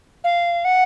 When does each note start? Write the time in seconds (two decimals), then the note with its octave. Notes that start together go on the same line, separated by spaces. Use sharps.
0.24 F5
0.65 F#5